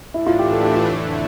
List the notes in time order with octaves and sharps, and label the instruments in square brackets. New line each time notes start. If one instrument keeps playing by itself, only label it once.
[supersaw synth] A2 E3 A3 D4 [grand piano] E4
[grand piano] F4
G4
A4
G4
F4
[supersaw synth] F2 D3 A3 E4